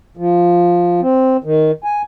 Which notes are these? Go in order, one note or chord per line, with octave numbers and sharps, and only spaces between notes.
F3
C4
D#3
G#5